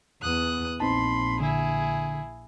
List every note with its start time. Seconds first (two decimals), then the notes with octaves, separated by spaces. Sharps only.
0.22 E2 B3 D#6 F#6
0.80 A#1 C4 D#4 A5 B5 C6
1.41 D3 E4 G#4